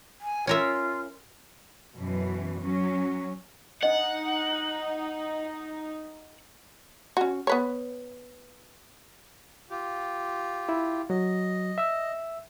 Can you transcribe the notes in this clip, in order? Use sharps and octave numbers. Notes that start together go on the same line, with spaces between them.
G#5
C#4 F4 A#4 E5
F#2 B2 E3
F#3 C#4
D4 D#4 D#5 F#5
C#4 F#4
B3 B4 C#5
F4 G4
E4
F#3 D#5
E5 E6